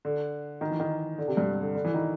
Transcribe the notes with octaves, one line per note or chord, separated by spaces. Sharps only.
D3
D#3
E3
D#3
D3
C3
G2
D3
D3
E3
D#3